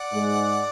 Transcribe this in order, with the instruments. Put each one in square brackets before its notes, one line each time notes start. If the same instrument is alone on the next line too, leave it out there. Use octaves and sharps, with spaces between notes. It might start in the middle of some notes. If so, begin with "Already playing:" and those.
Already playing: [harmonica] D5 F#5
[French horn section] G#2 G#3